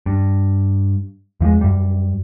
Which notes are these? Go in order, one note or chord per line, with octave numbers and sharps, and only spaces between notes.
G2
E2 F3 G3 G#3
F#2 G3